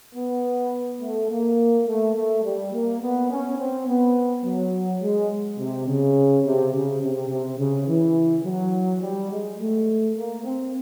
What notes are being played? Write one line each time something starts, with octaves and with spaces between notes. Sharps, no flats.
B3
A3
A#3
A3
A3
G3
A#3
B3
C#4
C4
B3
F#3
G#3
C3
C#3
C3
C#3
C3
C3
C#3
E3
F#3
G3
G#3
A3
A#3
C4